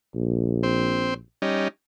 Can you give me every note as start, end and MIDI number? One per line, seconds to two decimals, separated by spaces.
0.15 1.19 34
0.63 1.14 60
0.63 1.14 72
1.42 1.68 55
1.42 1.68 61
1.42 1.68 63